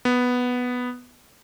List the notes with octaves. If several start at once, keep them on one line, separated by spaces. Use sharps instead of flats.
B3